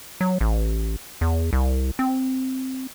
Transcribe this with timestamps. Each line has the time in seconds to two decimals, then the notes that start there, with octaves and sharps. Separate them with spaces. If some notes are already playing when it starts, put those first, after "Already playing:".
0.21 F#3
0.41 A1
1.21 E2
1.53 C2
1.99 C4